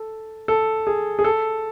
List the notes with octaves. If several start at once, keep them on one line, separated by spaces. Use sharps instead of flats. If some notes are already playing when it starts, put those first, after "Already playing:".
Already playing: A4
A4
G#4
G#4
A4